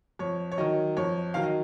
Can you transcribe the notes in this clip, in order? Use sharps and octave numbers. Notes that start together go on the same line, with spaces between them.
F2 C#5
C#5
D#3 F#3 D#5
F2 C#5
D#3 F#3 F5
D#5